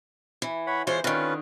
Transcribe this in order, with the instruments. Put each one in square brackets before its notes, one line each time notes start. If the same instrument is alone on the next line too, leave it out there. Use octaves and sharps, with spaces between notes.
[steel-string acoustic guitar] E3
[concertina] C#5 F#5 B5
[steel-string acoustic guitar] E3 G#3 C5 [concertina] F4 C#5
[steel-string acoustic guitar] D3 D#3 [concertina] C#4 F4 B4